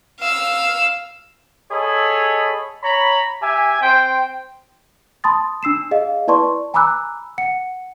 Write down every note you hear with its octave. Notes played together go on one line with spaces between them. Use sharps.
F5 E6
G#4 A4 C#5 D#5 B5
C#5 A#5 B5
G4 E5 G#5
C4 C5 G5
A5 B5 C6 D#6 A6
D4 E6 C7 E7
G#4 D#5 F5
E4 B4 D5 A5 C6 C#6
G#5 A#5 B5 D6 E6 F#6
F#5 C#7